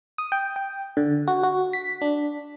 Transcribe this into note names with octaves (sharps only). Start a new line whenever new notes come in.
D#6
G5
G5
D3
F#4
F#4
B6
D4